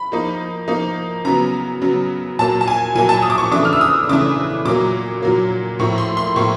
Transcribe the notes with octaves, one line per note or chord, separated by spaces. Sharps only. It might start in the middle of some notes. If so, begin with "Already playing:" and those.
Already playing: B5
F3 A#3 D#4
F3 A#3 D#4
C#3 F#3 B3 A#5
C#3 F#3 B3
A#2 F#3 A#3 A5
A5
G#5
A#2 F#3 A#3 G#5
A5
D#6
D6
C#6
C#3 E3 A3 D4 D6
F6
E6
D#6
C#3 E3 A3 D4 D6
A#2 F#3 A#3 D6
A#2 F#3 A#3
A2 F3 A#3 C#6
C6
C6
A2 F3 A#3 C#6